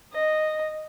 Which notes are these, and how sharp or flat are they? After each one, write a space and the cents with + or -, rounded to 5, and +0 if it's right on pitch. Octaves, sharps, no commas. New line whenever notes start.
D#5 -10